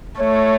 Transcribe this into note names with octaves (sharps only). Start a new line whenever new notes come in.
A3 C#5